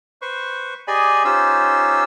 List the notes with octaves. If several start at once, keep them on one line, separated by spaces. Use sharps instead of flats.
B4 C5 C#6
G4 G#4 D5 D#5 G#5 B5
C#4 D#4 F4 G4 C5 E6